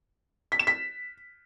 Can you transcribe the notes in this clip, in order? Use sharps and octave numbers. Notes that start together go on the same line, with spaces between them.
B6
E7
B6